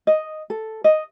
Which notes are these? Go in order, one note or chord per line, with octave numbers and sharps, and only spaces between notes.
D#5
A4
D#5